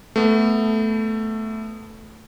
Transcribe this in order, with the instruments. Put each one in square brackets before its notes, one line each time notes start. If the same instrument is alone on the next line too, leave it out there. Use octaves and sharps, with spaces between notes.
[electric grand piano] A3 B3